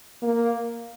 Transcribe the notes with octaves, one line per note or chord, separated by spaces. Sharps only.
A#3